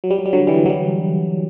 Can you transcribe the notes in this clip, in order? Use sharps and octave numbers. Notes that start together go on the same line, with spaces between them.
F#3
G3
F#3
G3
D3 F#3
E3 G3
F#3
E3 G3